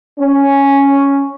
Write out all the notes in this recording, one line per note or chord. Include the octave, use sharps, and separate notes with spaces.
C#4